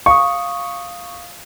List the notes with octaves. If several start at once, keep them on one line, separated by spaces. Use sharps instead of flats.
F5 C#6 D#6